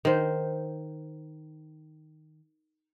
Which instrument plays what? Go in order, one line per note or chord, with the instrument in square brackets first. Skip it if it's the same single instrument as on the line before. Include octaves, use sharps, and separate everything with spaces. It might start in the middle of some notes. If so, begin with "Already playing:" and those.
[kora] D#3 C5